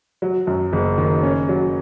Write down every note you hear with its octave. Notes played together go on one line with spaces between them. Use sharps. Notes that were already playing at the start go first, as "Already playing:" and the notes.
F#3
F#2
F#1
D#3
C#4
F#3